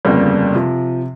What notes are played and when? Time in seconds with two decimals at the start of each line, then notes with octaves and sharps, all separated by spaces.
0.05 G1 F2 C#3 G3 A#3
0.55 C3 F3